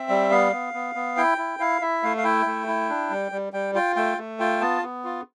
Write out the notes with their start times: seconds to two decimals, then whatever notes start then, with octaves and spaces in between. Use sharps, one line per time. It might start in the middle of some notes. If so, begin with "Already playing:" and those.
Already playing: C4 E5
0.09 G3
0.31 B3 F5
0.52 B3
0.74 B3
0.95 B3
1.17 E4 G5
1.38 E4
1.59 E4 F5
1.82 E4 E5
2.03 A3 F5
2.18 F5
2.24 E4 G5
2.46 A3
2.67 E4
2.89 D4
3.10 G3
3.32 G3
3.53 G3 G5
3.74 F4 G5
3.96 A3 G5
4.18 A3
4.40 F4 G5
4.61 B3 A5
4.82 B3
5.04 F4